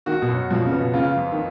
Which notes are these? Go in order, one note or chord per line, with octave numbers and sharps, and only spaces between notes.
D#3 F#4
B2
F#2
B2 F3
C#3
B3
B2
C#3 F4
F2
D#3